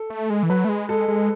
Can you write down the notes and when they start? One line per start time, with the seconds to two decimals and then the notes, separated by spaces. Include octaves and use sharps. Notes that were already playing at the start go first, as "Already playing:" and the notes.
Already playing: A4
0.10 A3
0.30 G#3
0.43 E3
0.50 F#3 B4
0.65 A3
0.69 G#3
0.89 G#3 A4
1.08 G#3